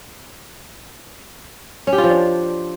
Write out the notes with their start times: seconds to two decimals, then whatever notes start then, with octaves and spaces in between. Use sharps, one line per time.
1.87 C#4
1.93 G4
1.98 F4
2.04 F3
2.09 D4